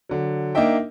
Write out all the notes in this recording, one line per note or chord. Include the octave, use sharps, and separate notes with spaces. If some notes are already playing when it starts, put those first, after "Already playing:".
D3 F#3
A#3 D4 D#4 D#5 E5 G5